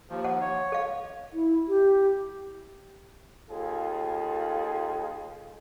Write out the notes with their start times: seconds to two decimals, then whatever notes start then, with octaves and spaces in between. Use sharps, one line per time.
0.10 D#2 F3
0.24 F#5
0.41 C#5
0.72 A4 F5
1.33 E4
1.68 G4
3.51 D#2 F4 G#4 A4